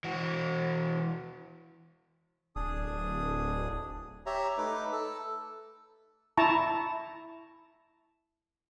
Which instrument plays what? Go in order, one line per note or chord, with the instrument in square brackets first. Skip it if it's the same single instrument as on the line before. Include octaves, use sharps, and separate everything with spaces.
[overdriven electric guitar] E3 F#4
[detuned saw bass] D1 [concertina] D4 G#4 D#6
[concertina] G4 C#5 E5 A#5
A3 D#4 B4 D6
A4
[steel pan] E4 A5 A#5 C#6